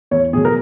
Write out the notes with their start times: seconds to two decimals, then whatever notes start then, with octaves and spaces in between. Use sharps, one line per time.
0.11 E2 C#5
0.33 B2 F#3 G#4
0.45 A#4